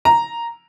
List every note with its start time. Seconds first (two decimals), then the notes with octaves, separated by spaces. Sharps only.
0.05 A#5